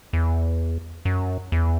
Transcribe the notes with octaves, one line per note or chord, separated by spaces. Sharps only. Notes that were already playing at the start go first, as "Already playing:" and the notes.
E2
F#2
E2